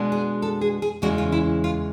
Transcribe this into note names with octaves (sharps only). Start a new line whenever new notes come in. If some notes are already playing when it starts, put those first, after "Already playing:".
Already playing: B2 G#3 B3 D4
G#4
A4
G#4
G#4
E2 C#3 E3 G#3 C#4 F#4
F4
E4
F4